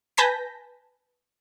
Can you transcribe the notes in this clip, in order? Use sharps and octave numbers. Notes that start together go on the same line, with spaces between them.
B4 G#5 A5 G6 A#6 B6